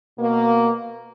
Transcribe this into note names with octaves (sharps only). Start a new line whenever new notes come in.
B2 A#3